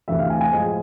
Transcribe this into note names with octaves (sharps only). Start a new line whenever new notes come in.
D2 C3 E3 A3 E5
F5
G#5
G#5
A2 F3 G#3